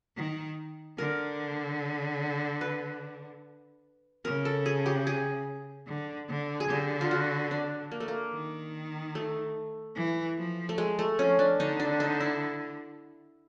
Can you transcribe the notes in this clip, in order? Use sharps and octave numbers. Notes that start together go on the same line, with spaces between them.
D#3
D3 A#4
B4
C#3 A#4
A4
G#4
G4
G#4
D3
D3
G#4
D3 G4
F4
F#4
D4
A#3
A3
A#3
D#3
A3
E3
F3
A3
G#3
A3
F3 C#4
D4
D3 D#4
D4
D#4
E4